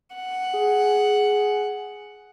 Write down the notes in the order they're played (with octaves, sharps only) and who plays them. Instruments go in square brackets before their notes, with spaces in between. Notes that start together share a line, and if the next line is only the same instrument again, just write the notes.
[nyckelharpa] F#5
[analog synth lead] G#4